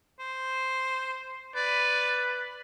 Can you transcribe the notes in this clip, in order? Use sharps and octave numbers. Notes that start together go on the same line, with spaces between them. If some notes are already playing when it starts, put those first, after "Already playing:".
C5
B4 D5